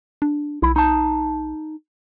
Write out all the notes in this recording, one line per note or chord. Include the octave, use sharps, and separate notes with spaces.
D4
B1 E4
D#4 A5